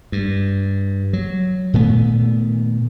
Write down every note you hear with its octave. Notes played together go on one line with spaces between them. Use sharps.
G2
F#3
A#2 D#3 A3 B3